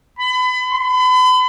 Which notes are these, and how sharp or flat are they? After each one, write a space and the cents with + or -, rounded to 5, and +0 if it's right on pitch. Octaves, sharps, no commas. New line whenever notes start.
B5 +35
B5 +40